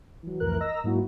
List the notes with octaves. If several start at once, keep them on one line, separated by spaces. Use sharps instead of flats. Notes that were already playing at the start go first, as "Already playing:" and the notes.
E3 F#3
C2 F2 A2 E3 A#4 F#6
A#4 D#5 A#5 E6 A#6
G#2 F#3 A#3 E4 F#4